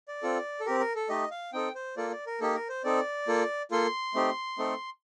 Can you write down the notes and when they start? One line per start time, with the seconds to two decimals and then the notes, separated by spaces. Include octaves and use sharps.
0.08 D5
0.23 C4 F4 A4
0.60 A4
0.66 C4 G4 A#4
0.80 A#4
0.95 A4
1.09 A3 D#4 G4 D#5
1.31 F5
1.53 C4 D#4 A4 G5
1.75 C5
1.96 A#3 F4 A4 D5
2.11 D5
2.27 A#4
2.41 A#3 D#4 G4 A4
2.55 A#4
2.69 C5
2.84 C4 D#4 A4 D5
3.28 A#3 F4 A4
3.71 A#3 F4 A4 C6
4.15 A3 C4 D#4 G4
4.58 A3 C4 D#4 A4